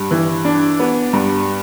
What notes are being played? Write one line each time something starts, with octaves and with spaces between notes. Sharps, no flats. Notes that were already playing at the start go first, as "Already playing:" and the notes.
Already playing: G2
E3
D4
B3
G2